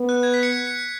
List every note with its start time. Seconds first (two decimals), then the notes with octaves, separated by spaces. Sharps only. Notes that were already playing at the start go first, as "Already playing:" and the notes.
Already playing: B3
0.09 F#6
0.23 G#6
0.34 B6
0.43 C#7
0.53 B6
0.67 C#7